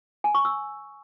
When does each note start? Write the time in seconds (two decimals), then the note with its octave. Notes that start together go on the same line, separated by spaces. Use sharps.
0.24 G#5
0.35 C#6
0.45 E6